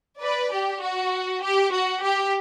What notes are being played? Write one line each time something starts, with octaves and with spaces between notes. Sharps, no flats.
B4 D5
G4
F#4
G4
F#4
G4